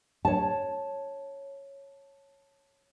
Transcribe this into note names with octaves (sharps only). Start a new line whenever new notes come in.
C#5 A5